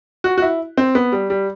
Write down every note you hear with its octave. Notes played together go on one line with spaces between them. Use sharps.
F#4
F#4
E4
C4
B3
G3
G3